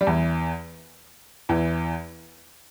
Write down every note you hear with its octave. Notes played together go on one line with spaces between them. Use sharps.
G3
E2 E3
E2 E3